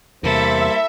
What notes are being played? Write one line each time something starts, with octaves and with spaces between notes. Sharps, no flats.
E2 C3 G3 A#3 E4 A4 C5 E5